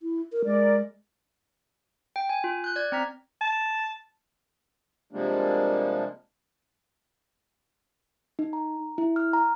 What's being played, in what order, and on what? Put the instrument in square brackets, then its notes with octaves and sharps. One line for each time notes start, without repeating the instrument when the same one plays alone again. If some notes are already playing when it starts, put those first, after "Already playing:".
[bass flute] E4
A#4
[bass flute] G#3 [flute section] A#4 D5
[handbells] G5
G#5
F4
F#6 G6
D5 G6 G#6
C4 A#5 B6
[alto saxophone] A5
[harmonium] C3 F3 G3 G#3 A#3 D4
[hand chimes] D#4
A#5
E4
F6
A#5